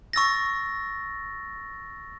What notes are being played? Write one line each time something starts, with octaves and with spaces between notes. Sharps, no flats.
C#6 E6 A6 A#6